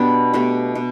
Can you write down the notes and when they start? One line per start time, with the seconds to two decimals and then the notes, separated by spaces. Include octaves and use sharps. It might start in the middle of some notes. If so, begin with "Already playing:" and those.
Already playing: B2 B3 D4 G4
0.33 B2 A3 G4
0.75 B2